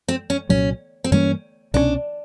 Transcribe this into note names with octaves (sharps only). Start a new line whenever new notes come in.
C4
C#4
C2 A#2 F#3 C#4
C4
G2 E3 G3 A#3 C#4
C2 B2 G#3 C#4 D4